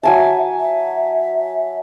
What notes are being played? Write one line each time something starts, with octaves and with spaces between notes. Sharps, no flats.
F#3 E5 G#5 A5
E5